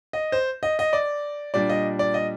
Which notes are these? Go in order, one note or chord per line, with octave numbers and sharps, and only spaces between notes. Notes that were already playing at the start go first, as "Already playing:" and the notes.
D#5
C5
D#5
D#5
D5
A#2 G3 D4 D5
D#5
D5
D#5